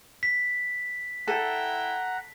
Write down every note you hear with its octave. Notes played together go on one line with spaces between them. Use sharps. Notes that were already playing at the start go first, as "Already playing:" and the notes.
B6
E4 A4 E5 F#5 G5 A#5